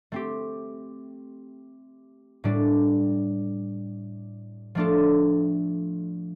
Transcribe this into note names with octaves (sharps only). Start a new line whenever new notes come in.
A3 C4 G4
A2 G3 D4 A4
F3 A3 D4 F4 A4